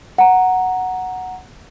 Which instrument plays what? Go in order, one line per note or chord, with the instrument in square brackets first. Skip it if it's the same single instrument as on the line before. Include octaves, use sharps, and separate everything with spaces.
[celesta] F#5 A#5